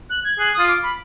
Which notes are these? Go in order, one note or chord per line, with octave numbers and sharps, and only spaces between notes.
F#6
G#6
G#4 F#6
D#6
F4
D6
B5